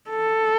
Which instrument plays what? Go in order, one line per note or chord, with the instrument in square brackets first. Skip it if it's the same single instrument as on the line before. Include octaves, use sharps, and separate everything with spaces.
[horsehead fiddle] A4